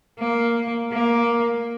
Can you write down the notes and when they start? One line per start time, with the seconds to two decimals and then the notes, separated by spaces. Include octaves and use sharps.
0.20 A#3
0.92 A#3